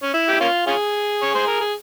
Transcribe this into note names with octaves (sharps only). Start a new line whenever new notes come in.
C#4
E4
G4
A#3 C#4 F4
C#4 F4 G#4
C#5
C5
A#4
G#4